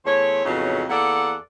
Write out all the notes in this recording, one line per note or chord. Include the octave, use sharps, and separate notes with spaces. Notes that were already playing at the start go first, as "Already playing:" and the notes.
E2 A3 C5 C#5
F2 A2 C#3 F#3 B3 D#4
E2 A#3 A4 D5 F#5